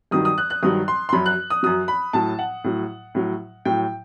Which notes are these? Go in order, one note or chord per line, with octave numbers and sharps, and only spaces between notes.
G2 D#3 F#3 D#6
D#6
F#6
F#6
G2 D#3 F#3 D#6
C6
C6
F#2 F#3 B5
F#6
D#6
F#2 F#3 D#6
B5
A2 F#3 A5
F#5
A2 F#3
A2 F#3
A2 F#3 G5